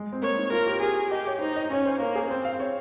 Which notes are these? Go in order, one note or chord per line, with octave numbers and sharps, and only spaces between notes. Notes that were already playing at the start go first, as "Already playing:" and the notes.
Already playing: G#3
C4
A#3 C#5
D#4
F4 A#4
G4
G4 G#4
G4 D#5
C#5
D#4 C5
D#5
C#4 C#5
C5
A#3 A#4
G#4
C4 C5
F5
C#5